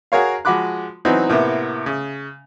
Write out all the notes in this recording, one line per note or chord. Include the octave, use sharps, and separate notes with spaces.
F#4 G#4 A#4 C#5 F5
F3 G#3 F#4 B5 D6 F#6
E3 F#3 B3 C4 D#4
A2 C3 A#3 B3
C#3